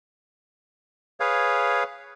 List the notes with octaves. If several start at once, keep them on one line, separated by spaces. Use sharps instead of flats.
G#4 B4 C#5 F5